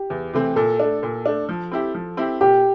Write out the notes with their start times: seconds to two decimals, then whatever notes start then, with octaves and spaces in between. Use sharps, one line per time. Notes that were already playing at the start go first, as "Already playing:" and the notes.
Already playing: G4
0.10 E2
0.33 C3 E3 A3 C4
0.56 A#2 A4
0.80 A3 D4
1.03 A#2
1.26 A3 D4
1.49 F3
1.72 C4 E4 G4
1.95 F3
2.17 C4 E4 G4
2.41 A#2 G4